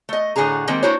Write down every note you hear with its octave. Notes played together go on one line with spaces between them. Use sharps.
A3 D#5
A2 D3 F#4 G#4 A#5
D#3 G3 G#3 A#3 C4
A#3 D4 E4 F#4 C5 C#5